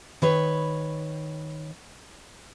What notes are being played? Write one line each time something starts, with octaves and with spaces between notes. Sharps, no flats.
D#3 B4 C#5